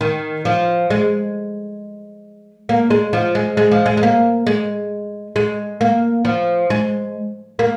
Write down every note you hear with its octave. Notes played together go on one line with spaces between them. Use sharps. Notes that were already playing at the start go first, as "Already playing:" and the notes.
D#3
F3
G#3
A#3
G#3
F3
G#3
G#3
F3
G#3
G#3
A#3
G#3
G#3
A#3
F3
G#3
A#3